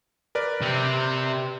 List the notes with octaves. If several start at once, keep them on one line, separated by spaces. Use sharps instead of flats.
A#4 B4 D5
C3 C4